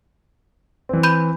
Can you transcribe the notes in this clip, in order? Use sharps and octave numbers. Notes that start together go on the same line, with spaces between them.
E3 C4
B5 G6 D#7